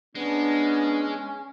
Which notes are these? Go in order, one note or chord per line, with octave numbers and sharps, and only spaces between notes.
G#3 B3 C#4 D4